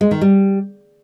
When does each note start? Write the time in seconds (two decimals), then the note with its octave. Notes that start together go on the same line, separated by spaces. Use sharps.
0.01 G#3
0.11 D#3
0.21 G3